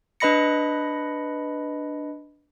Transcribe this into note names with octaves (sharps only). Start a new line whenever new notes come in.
D4 B4 D#5 B5 A#6 C#7